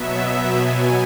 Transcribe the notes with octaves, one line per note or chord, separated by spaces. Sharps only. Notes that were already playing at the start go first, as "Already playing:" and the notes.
Already playing: B2 F#3 B3 E5
G#5